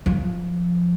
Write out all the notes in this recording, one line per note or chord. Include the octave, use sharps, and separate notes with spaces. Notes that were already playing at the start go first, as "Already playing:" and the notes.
F3